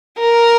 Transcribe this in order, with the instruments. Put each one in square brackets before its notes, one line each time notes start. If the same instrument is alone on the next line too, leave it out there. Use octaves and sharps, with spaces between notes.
[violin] A#4